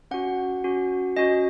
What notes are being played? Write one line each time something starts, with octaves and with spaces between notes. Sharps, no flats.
C#4 F#4 F#5
C#4 F#4
C#4 F#4 D#5